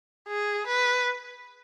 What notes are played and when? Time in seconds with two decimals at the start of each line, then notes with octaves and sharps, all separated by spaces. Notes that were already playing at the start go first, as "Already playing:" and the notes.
0.29 G#4
0.67 B4